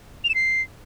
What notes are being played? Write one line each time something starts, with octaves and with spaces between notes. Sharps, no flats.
F7
E7
C7